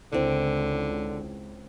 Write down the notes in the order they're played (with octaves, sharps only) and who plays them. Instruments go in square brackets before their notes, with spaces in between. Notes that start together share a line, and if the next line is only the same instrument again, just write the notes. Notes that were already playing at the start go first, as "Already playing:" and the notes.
[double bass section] C#2 [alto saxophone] D3 [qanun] C4 E4